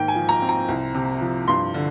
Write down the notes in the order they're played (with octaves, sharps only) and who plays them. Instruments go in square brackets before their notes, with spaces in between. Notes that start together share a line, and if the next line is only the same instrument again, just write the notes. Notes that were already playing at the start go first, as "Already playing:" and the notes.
Already playing: [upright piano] G#2 D#3 A#3 G5
G#5
F3
A#5
C4
A#5
C2
C3
F3
G2 C6
D3